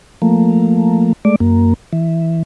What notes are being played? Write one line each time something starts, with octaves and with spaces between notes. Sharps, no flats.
F3 A3 A#3
G#3 A3 D5
F#2 A#3
E3